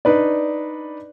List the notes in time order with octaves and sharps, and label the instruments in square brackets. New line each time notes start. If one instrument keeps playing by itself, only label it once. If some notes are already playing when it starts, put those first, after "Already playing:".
[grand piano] D4 D#4 B4 D5